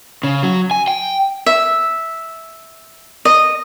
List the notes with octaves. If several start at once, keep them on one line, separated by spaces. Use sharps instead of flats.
C#3
F#3
G#5
G5
E5
D#5